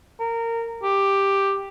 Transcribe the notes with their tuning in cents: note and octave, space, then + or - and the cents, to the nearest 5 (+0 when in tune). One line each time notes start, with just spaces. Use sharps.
A#4 -20
G4 +5